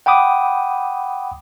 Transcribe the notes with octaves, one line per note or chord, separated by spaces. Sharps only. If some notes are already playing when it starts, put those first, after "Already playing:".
F#5 G5 B5 D6 D#6